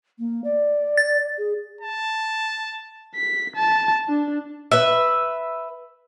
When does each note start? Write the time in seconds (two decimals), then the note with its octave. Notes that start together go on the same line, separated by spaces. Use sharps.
0.19 A#3
0.44 D5
0.97 A6
1.38 G#4
1.81 A5
3.15 B6
3.56 A5
4.09 D4
4.72 B4 E5